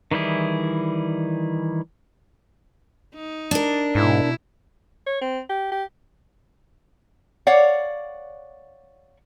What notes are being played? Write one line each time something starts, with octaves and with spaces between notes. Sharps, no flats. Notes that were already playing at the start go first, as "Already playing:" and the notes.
D#3 E3 G3 E4 G#4
D#4
D4 A#4
G#2 B2 E4
C#5
C4
G4
G4
C#5 D5 F5 F#5